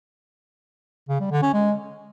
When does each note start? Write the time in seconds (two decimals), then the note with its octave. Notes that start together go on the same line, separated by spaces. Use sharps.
1.09 C#3
1.20 G3
1.31 D3
1.42 C#4
1.53 G#3